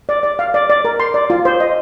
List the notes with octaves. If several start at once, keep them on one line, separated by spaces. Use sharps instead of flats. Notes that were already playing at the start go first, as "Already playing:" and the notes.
D5
D5
F5
D5
D5
A#4
C6
D5
F4
C5
D#5